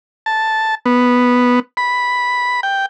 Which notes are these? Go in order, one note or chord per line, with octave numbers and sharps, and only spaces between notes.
A5
B3
B5
G5